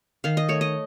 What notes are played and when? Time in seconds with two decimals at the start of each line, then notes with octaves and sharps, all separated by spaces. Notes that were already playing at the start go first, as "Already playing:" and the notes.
0.24 D#3 F5
0.37 D#5
0.48 A3 C#5
0.61 D#5